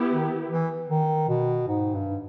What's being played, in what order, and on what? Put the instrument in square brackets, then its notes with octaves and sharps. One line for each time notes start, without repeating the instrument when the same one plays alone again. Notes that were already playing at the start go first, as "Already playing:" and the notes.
Already playing: [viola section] B3 E4 G4
[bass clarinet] D#3
E3
D#3
B2
G#2
G2